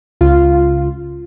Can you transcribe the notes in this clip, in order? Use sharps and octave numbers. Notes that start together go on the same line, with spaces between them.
C#2 F4